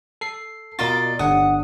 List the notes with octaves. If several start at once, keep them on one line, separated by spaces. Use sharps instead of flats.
A4 C7
B2 F4 A#4 D5 D#5 A6
G1 D4 F#5 D#6